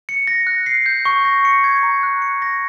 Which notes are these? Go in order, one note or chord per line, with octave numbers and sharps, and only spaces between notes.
C#7
A#6
F#6
C7
G6
C#6
A#6
C#7
G#6
A#5
F#6
C#7
A#6